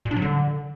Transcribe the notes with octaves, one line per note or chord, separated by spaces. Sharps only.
A#2
D4
F#3
D3